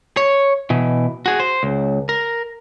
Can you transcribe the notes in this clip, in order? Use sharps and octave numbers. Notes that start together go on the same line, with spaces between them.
C#5
B2 E3
F#4 G#4
C5
C#2
A#4